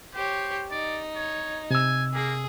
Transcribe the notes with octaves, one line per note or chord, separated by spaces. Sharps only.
G4 C5 C#5
D#4 D5
C#5
C3 G#5 E6
A#3 G#4